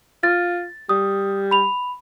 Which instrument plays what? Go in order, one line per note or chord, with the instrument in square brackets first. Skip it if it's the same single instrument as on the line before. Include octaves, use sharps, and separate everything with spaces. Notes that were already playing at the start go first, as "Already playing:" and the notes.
[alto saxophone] F4 [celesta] A6
[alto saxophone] G3 [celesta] D#6
[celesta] B5 F7